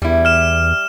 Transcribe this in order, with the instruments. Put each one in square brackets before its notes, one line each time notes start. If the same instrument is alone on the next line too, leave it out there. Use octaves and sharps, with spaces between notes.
[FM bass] E2 [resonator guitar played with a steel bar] G3 E4
[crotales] F6 E7